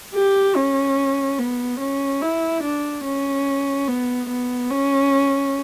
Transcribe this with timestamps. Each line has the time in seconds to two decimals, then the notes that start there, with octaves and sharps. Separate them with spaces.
0.14 G4
0.56 C#4
1.39 B3
1.80 C#4
2.22 E4
2.63 D4
3.05 C#4
3.88 B3
4.30 B3
4.71 C#4